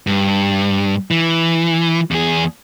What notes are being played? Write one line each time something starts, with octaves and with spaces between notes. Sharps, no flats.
G2
E3
E2 G#4